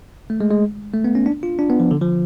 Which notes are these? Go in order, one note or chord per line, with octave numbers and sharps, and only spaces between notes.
A3
G#3
G#3
A3
B3
C#4
D4
F4
D4
B3
F3
D3
F3